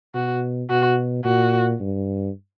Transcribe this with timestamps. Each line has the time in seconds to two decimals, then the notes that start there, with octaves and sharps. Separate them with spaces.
0.14 B2 F#4
0.70 B2 F#4
1.24 A#2 F#4
1.80 G2